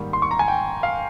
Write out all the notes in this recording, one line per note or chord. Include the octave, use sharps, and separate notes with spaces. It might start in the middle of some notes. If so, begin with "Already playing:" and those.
Already playing: G#2 D#3 G3 A#3
C6
C#6
A#5
G#5
G5
F5